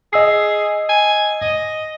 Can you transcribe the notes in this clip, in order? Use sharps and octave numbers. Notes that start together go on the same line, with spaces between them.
G#4 D#5 E6 C7
G#5
D#5